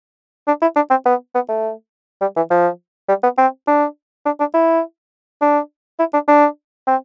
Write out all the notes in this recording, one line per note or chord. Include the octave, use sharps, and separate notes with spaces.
D4
E4
D4
C4
B3
B3
A3
G3
E3
F3
G3
B3
C4
D4
D4
D4
E4
D4
E4
D4
D4
C4